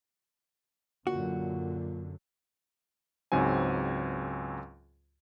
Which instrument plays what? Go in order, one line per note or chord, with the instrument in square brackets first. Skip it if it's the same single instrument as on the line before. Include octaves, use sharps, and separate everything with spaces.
[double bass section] F#2 D3 [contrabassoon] A#2 [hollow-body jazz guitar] F#4
[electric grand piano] C#2 G#2 F#3 C4 G#5